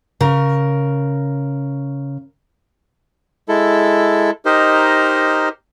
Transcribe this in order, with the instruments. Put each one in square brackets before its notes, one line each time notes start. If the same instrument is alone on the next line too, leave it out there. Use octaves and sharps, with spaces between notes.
[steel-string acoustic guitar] C#3 A#4
[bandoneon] G#3 E4 A4
D#4 G4 A#4 C5 D#5